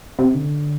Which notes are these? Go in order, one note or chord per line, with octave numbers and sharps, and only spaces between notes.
C3
D3